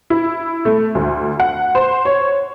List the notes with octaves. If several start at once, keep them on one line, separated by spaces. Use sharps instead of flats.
E4
A3
D2
F#5
C5
C#5